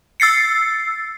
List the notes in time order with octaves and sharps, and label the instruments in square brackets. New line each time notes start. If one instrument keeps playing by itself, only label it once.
[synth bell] E6 A6 C7 C#7